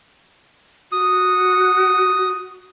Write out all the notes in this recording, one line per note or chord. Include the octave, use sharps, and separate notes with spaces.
F#4 D#6